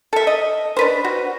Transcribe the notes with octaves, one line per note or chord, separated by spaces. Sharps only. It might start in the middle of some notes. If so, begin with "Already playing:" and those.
A4 E5
D#5
D4 B4 C5
F#4